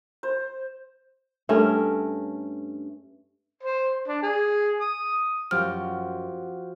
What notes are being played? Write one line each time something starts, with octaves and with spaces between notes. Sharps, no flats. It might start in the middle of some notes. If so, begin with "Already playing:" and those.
C5
G2 A3 C#4 A#4
C5
D4
G#4
D#6
F#2 F3 F#4 G4 F6